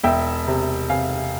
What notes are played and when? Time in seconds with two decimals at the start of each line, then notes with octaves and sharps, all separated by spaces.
0.04 E1 E5 G5
0.47 C3
0.90 C3 F5 G#5